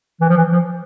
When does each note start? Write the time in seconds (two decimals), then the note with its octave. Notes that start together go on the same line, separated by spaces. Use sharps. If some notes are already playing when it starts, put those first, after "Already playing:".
0.21 E3
0.29 F3
0.38 E3
0.52 F3